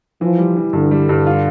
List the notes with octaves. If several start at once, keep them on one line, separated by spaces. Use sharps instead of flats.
E3 F3
G3
E3
G2 D3
G3
G2
F4